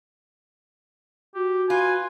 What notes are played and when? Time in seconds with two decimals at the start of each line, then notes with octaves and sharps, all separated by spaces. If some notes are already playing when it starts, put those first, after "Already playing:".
1.35 F#4 G4
1.70 F4 B4 G#5